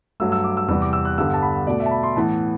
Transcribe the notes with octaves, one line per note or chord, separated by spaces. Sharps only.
G2 F#3 A3 E6
E6
D6
E6
E2 C3 G3 B3 E6
D6
E6
F#6
G2 D3 G3 B3 E6
A5
B5
B2 A3 D5
E5
A5
B5
C6
A2 E3 B3 A5